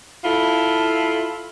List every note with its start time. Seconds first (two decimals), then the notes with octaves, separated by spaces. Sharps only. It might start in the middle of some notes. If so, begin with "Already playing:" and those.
0.24 E4 F4 A4